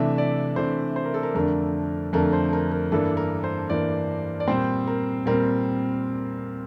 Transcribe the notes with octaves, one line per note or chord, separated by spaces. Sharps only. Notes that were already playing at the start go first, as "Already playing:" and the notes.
Already playing: C3 E3 A3 D4 E5
D5
C3 E3 A3 D4 C5
C5
A#4
A4
A#4
F2 D3 A3 D4 A#4
F2 D3 A3 D4 A#4
C5
A#4
A#4
G2 E3 A#3 D4 A4
A#4
C5
G2 E3 A#3 D4 D5
D5
A#2 G3 C4 C5
A#4
A#2 G3 C4 A#4